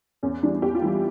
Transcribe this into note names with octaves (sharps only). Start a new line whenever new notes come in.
E2 C#4
E3 G3 D4
E2 G4
F4
E3 G3 E4